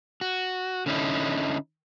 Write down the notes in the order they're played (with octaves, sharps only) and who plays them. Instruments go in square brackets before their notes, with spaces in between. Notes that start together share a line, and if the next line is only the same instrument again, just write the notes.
[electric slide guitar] F#4
D3 C#4 D#4 E4